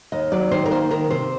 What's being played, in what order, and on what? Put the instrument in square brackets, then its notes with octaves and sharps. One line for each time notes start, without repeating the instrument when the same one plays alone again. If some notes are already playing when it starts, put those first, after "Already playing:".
[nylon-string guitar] D#2 D#5
F#3 D5
D#3 C5
A#4
A#3 C5
D#3 A#4
C3 C5